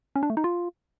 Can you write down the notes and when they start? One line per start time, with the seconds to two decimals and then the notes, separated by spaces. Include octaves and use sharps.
0.16 C#4
0.23 D4
0.30 A3
0.37 D#4
0.44 F4